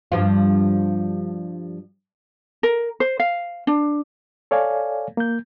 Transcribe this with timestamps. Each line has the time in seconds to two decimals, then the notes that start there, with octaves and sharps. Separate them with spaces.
0.12 G2 F3 F4
2.63 A#4
3.00 C5
3.20 F5
3.67 D4
4.51 A4 C#5 D5 F5 G#5
5.17 A#3 G6